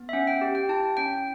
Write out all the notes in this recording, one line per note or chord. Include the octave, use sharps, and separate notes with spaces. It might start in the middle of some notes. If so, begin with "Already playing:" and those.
Already playing: B3
E5
C#4 F#5
G5
G4
G5
E4 A5
C#4 G5